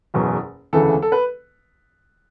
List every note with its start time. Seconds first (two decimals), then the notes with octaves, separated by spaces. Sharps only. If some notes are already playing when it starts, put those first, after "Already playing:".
0.14 F#1 E2 B2 F#3
0.73 E1 D2 C#3 E3 A4
1.02 A4
1.12 B4